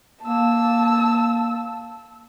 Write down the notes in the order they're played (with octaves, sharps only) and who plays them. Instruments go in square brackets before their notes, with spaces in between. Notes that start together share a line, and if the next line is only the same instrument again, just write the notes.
[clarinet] A#3 [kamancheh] A5 E6